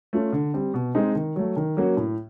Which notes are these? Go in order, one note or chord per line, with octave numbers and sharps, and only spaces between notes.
A3 C#4 F4
D3
G3 C4
B2
G#3 C4 D#4
D#3
F#3 A3
D#3
F#3 A#3 C#4 F#4
A2